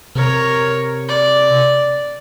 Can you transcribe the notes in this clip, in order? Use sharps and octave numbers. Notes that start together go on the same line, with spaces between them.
C3 A#4 C#5
D5